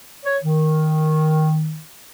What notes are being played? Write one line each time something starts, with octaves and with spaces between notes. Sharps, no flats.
C#5
D#3